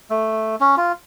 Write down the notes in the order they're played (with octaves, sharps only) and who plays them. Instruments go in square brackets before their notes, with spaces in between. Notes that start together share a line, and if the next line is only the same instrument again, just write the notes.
[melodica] A3
C#4
F4